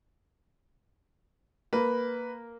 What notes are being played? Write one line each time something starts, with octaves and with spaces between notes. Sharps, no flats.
A#3 B4